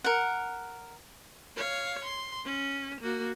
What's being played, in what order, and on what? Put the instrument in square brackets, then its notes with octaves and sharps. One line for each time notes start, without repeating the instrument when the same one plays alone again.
[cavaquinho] A#4 F#5
[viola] C#5 F5
C6
C#4
A#3 F#4